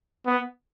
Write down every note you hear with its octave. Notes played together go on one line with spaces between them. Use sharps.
B3